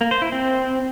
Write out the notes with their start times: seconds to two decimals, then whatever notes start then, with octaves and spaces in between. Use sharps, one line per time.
0.01 A#3
0.11 C5
0.22 E4
0.32 C4